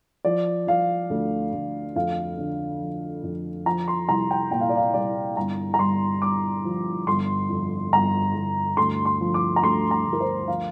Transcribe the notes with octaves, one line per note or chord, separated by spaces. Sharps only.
F3 D5
F3 F5
D2
D2
F2 F5
D3
F3
F2
F3 A#5
C6
C2 A#5
G5
A#2 G5
F5
D5
F5
C2 D5
G1 A#5
A#5
G2 C6
G2 D6
F3
G1 C6
F2
G1 A#5
G1
D2 C6
C6
F3
D6
A#5
D2 C6
A#5
D2
A#4
C5
F3 F5